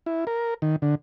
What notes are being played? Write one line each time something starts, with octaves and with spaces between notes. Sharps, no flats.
E4
A#4
D#3
D3